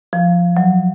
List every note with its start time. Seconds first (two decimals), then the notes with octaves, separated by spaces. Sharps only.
0.13 F3
0.57 F#3